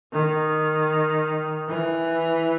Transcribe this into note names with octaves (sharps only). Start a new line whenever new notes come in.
D#3
E3